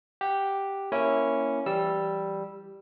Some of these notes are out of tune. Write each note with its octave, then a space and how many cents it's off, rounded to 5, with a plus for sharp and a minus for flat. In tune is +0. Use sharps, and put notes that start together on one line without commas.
G4 +0 F#5 +0
A#3 +0 C#4 +0 E4 +0
E3 +35 G3 +0 E6 +0